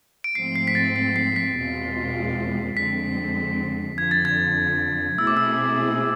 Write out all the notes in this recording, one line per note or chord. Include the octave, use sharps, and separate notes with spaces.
D7
G#2 F3 A3 C4 C7
C7
B6
A6
C7
C7
B6
E2 B2 G#3 C4 F4
F2 D3 G#3 C4 B6
F2 D3 F3 G#6
A6
G#6
B2 A3 C4 E4 G#4 E6
D6
E6